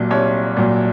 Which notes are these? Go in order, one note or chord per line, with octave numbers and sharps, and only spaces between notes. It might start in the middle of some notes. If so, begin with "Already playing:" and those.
Already playing: C2 A#2 F#3
C2 C#5
A#2 F#3